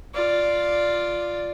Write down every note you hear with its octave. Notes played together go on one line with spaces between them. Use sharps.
F4 D5